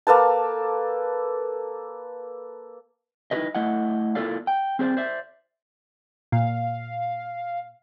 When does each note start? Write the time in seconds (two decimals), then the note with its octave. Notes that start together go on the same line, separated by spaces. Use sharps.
0.07 A#3 A4 B4 A5
3.31 D#4 E4 G4 G#4 B4 D#5
3.55 A3 E4 D#5 F#5
4.15 A#3 E4 F4 A4 D5 F5
4.47 G5
4.79 C4 G#4 C5 D5
4.97 C5 D5 E5
6.32 A#2 F5